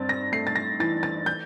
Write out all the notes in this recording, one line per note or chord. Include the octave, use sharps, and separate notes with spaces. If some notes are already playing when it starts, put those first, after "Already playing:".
Already playing: G2 C4 A6
A#6
A3 C7
A6
A#6
E3 A6
A6
G6